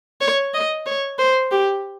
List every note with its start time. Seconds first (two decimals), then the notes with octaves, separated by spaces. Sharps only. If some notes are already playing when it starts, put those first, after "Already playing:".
0.21 C#5
0.54 D#5
0.86 C#5
1.18 C5
1.51 G4